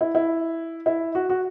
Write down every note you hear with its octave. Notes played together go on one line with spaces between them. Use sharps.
E4
E4
E4
F#4
F#4